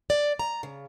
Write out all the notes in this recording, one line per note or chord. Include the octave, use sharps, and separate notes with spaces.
D5
A#5
C#3